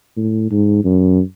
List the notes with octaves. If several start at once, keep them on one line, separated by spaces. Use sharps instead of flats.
A2
G#2
F#2